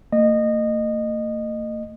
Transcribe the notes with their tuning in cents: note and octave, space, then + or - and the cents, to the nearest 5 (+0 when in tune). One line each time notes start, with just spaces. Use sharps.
A#3 -45 D#5 -20